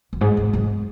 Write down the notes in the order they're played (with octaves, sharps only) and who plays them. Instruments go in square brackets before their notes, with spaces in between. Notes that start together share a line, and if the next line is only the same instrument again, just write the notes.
[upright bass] F#2
[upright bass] G#2 [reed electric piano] G#3
[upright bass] G#2
F#2